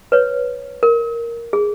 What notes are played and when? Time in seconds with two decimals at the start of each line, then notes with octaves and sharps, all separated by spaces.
0.12 B4 C#5
0.83 A#4
1.53 G#4